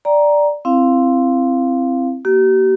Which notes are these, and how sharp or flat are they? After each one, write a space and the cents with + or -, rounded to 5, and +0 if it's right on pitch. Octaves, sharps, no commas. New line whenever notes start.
D5 +0 G5 +0 A#5 +10
C4 +0 E4 +15 F5 +0
A#3 +5 G4 -40